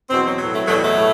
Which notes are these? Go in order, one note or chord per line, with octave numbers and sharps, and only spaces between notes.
E2 B2 F#3 C4
F#3
A2 F#3
A3
E2 B2 F#3 A3
G3
A3
A2